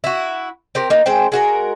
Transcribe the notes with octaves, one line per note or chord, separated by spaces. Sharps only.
E4 F#4
C4 G4 A#4
A#3 D#4
G#3 C4 C5 G5
G#3 F#4 A#4